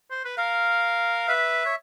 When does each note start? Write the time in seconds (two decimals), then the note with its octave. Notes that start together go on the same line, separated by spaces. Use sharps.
0.11 C5
0.25 B4
0.37 A#4 F5
1.28 B4 E5
1.65 C#5